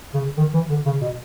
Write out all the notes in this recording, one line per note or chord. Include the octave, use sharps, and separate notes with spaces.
C#3
D#3
E3
D3
C#3
B2